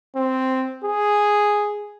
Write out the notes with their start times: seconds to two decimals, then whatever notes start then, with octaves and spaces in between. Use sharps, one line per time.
0.16 C4
0.84 G#4